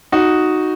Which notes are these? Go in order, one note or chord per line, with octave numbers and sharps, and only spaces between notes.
D#4 F#4